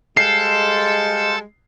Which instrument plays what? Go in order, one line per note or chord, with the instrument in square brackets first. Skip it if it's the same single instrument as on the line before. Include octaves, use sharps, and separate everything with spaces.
[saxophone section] G3 G#3 [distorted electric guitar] A4 [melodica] C5 F5 C6 [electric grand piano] C7